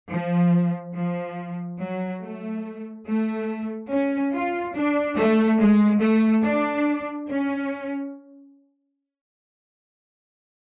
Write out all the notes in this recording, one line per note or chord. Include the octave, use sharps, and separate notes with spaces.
F3
F3
F#3
A3
A3
C#4
F4
D4
A3
G#3
A3
D4
C#4